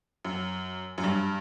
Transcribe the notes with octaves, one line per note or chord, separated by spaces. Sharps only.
F#2
F#2
G2